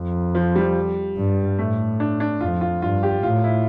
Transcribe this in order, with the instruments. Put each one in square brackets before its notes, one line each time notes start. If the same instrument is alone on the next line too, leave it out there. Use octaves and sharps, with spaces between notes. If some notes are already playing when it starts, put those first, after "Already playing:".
Already playing: [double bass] F2
[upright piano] F3
G3
[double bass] G2
[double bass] A2 [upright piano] A3
[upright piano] D4
D4
[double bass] F2 [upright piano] F4
[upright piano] F4
[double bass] G2 [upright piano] F4
[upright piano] G4
[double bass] A2 [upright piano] F4
[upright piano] E4